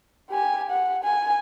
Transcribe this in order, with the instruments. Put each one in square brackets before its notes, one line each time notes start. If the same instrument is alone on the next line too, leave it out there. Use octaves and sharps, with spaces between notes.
[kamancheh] G4 G#5
F#5
G#5